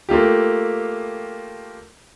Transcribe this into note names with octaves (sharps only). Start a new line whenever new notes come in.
A3 A#3 F4 G4